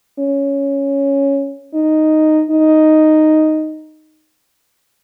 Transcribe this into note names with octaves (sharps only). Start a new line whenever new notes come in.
C#4
D#4
D#4